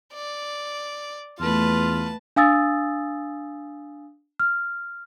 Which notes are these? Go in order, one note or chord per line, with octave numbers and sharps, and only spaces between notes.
D5
E2 A3 F4 B4 A5
D4 F5 G#5 D#6 E6 A6
F6